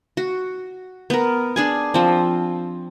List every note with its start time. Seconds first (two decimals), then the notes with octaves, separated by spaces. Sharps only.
0.17 F#4
1.10 B3 A#4
1.56 D4 G#4 G#5
1.94 F3 C4